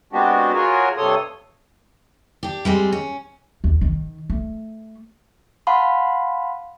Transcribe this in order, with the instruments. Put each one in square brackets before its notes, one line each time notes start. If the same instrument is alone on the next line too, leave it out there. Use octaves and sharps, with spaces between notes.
[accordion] G#3 B3 C4 D4 F#4 G4
F4 F#4 G#4 A#4 C#5
G2 C3 A4 C#5 C6 D#6
[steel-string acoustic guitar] D4 G4
G3 G#3 C4
C#4
[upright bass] D#2
D#3
A3
[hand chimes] F5 F#5 A5 B5 C6